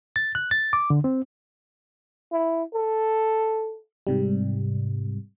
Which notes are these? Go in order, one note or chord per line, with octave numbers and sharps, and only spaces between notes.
A6
F#6
A6
D6
D3
C4
E4
A4
G#2 C3 G3